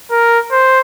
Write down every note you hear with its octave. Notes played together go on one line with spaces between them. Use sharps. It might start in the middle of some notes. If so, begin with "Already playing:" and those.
A#4
C5